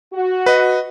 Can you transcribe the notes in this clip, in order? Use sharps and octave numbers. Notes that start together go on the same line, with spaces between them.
F#4
B4 D#5